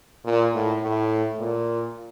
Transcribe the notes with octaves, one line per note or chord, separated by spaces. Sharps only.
A#2
A2
A2
A#2